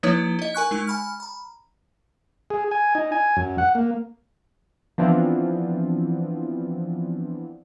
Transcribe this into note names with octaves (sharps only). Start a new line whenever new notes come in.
F3 A#3 D#4 E4 B4 C#5
D#4 D#5
A#4 G#5 C#6 F#6
G#3 D#4 C#6
G#5 B5 F6
A#5 B5
G#4
G#5
D#4
G#5
F#2
F#5
A#3
E3 F3 B3 C4 D4 F4